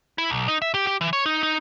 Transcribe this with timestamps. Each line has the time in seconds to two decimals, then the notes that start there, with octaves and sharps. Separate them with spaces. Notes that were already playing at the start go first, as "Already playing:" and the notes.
0.18 E4
0.30 B1
0.48 D#4
0.62 E5
0.74 G4
0.87 G4
1.01 E3
1.13 C#5
1.26 D#4
1.43 D#4